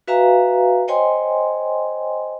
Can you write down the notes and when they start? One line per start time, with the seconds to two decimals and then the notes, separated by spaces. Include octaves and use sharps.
0.08 F#4 B4 E5 F5 G#5 A#5
0.88 C5 C#5 D#5 G5 G#5 C6